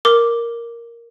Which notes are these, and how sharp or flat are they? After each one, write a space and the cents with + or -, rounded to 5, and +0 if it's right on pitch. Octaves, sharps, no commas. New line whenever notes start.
A#4 +0 D6 +0